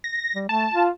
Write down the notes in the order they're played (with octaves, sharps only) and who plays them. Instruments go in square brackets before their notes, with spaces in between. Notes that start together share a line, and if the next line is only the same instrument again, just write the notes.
[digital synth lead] A#6
[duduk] G3
[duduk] A3 [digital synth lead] A5
[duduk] F4